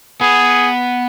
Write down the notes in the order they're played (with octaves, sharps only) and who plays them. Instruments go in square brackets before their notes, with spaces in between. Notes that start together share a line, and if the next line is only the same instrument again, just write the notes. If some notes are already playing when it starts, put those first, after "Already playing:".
[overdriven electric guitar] B3 [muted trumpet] G#4